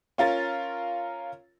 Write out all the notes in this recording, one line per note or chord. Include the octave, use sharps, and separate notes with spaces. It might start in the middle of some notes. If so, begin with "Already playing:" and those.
C#4 F4 A#4 A6